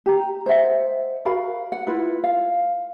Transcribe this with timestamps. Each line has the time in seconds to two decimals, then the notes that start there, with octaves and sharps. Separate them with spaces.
0.06 G4 A#5
0.46 C5 D#5 E5 F#5
1.25 F#4 A#4 F5 B5
1.72 F#5
1.87 E4 F4 B4
2.24 F5